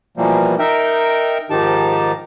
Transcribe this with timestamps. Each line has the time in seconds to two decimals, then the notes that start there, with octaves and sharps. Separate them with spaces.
0.17 B2 E3 F3 G3 A#3
0.59 D#4 A#4 E5 G5
1.50 G#2 D#3 F3 D#4 G4 A5